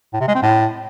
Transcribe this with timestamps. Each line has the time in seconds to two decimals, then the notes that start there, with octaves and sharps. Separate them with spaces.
0.13 A2
0.21 C3
0.28 G#3
0.35 C4
0.42 A2